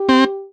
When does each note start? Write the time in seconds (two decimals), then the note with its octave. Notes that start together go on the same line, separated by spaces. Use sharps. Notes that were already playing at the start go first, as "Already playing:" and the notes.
Already playing: G4
0.09 C4